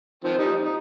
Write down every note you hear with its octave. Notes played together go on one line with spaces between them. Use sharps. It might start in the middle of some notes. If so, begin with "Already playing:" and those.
D#3 F3 C4
G3 D#4
D#4